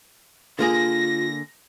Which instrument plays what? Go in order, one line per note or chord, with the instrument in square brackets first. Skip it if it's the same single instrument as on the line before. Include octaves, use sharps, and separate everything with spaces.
[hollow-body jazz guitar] D3 A#3 G#4 [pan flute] F4 [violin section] A#6